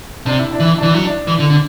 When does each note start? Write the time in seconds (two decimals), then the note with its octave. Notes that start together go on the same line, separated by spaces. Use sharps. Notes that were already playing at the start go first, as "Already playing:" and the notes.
0.26 C3 D4
0.39 E4
0.52 D4
0.60 E3
0.65 E4
0.78 E3 D4
0.91 F#3 E4
1.04 D4
1.27 E3
1.39 D3
1.50 D3